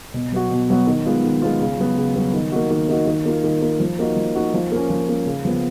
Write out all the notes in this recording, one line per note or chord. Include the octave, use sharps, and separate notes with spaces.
B2
F#3 B3 F#4
B2
F#3 B3 F#4
D#3
G#3 B3 F4
D#3
G#3 B3 F4
C#3
F#3 B3
C#3
F#3 B3
D#3
A#3 D#4 F#4
D#3
A#3 D#4 F#4
D#3
A#3 F4
D#3
A#3 F4
F3
A#3 D#4 F#4
F3
A#3 D#4 F#4
F3
A#3 C#4
F3
A#3 C#4
C#3
F3 B3